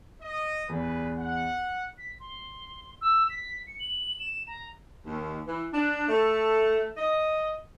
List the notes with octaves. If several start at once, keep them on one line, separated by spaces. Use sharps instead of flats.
D#5
E2 G3 G#4 B4
F#5
B6
C6
E6
B6
C#7
F#7
E7
A#5
D#2
E3
D4
A3
D#5